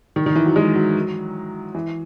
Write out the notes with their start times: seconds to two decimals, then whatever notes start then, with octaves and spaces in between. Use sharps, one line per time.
0.16 D#3
0.26 D#3
0.36 E3
0.46 F#3
0.56 G#3
0.75 F#3
1.75 E3